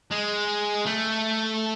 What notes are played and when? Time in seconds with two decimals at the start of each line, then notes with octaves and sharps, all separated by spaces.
0.11 G#3
0.86 A3